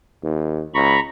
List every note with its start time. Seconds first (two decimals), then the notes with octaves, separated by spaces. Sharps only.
0.23 D#2
0.74 C#2 A#5 B5 C#6